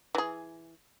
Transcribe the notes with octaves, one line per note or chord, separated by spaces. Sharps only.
E3 G#4